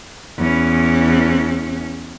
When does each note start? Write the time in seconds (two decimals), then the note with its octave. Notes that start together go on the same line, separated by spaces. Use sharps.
0.38 E2 C#4